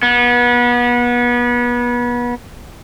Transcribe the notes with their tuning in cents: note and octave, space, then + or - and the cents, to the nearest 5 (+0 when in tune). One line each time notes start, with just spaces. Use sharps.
B3 -30